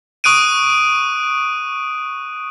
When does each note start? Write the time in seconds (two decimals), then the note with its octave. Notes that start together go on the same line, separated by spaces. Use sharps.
0.24 C#6 D#6 F#6 D7 D#7